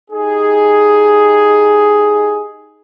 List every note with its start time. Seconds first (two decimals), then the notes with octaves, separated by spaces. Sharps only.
0.11 D#4 G4 G#4